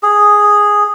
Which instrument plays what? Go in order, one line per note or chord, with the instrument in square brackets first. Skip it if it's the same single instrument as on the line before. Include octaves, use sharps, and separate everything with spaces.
[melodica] G#4